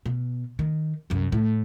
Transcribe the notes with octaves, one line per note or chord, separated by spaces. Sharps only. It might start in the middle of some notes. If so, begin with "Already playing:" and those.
B2
D#3
C2 F#2
A2